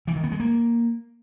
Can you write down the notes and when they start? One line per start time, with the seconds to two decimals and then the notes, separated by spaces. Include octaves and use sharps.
0.07 E3
0.16 D#3
0.24 B3
0.32 G#3
0.40 A#3